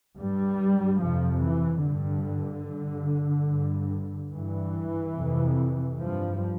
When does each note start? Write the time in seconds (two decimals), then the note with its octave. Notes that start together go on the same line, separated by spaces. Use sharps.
0.17 G2 G3
1.00 F2 C3 F3
1.42 E3
1.83 G2 D3
2.67 G2
3.50 G2
4.32 G2 E3
5.15 F2 C3
5.98 G2 F3